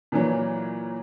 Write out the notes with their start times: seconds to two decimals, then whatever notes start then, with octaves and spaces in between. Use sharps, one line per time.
0.12 A#2 E3 F#3